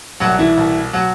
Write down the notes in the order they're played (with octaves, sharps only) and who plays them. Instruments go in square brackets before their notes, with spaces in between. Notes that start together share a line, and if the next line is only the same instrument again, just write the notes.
[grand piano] C2 B2 F#3 F#4
E3 E4
C2 B2
B2 F#3 F#4